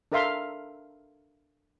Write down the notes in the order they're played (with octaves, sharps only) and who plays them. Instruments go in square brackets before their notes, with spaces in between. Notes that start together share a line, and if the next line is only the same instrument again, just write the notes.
[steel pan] D4 A4 A#4 E5 F5 C6